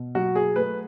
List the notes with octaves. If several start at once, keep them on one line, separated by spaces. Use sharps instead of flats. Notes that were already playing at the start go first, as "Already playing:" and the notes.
Already playing: B2
F#3 F#4
G#4
A3 B4